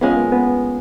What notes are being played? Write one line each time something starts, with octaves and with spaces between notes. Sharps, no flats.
G#3 B3 C#4 F4 G#4
A#3
B3